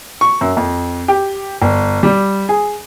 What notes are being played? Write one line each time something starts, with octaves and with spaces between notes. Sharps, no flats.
C#6
F#2
F2
G4
G1
G3
G#4